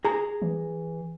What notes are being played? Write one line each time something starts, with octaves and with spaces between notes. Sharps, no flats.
G#4 A#5
E3